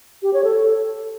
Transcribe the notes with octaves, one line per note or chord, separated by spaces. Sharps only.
G4
C#5
A4